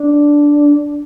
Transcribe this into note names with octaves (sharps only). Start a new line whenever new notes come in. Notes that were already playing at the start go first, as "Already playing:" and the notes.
Already playing: D4